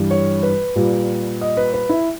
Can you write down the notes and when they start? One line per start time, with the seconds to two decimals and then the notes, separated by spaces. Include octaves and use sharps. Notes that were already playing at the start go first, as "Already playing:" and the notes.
Already playing: G2 E3 G3
0.11 C#5
0.43 B4
0.76 A#2 G3
1.41 D#5
1.57 B4
1.74 B4
1.89 E4